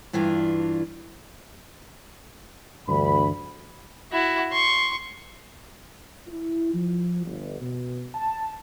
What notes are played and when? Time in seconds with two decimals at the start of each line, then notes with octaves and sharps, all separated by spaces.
0.13 G2 E3 D4 F4
2.88 D2 G2 D3 E3 B5
4.12 E4 F#4
4.52 C6 C#6
6.27 E4
6.74 F3
7.25 G1
7.61 B2
8.14 A5